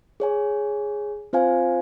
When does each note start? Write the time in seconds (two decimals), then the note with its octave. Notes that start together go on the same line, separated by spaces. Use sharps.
0.20 G#4 C#5 G#5
1.33 C4 F4 C5 F5 G#5